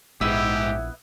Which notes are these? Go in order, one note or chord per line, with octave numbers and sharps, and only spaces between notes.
A#1 G#2 B3 E4 G4 E6